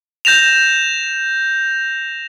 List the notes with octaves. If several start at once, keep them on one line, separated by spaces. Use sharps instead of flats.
G6 A#6 E7 F7